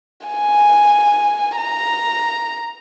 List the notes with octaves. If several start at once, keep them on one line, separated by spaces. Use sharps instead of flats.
G#5
A#5